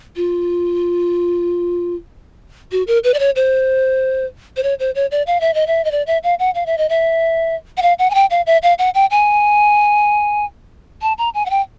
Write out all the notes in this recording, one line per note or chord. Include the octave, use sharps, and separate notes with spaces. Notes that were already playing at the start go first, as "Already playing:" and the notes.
F4
F#4
A#4
B4
D5
C#5
C5
C5
C#5
C5
C#5
D5
F5
E5
D#5
E5
D#5
D5
E5
F5
F#5
F5
E5
D#5
E5
F#5
F5
F#5
G#5
G5
F5
E5
F5
F#5
G5
G#5
A5
A#5
G#5
F#5
G5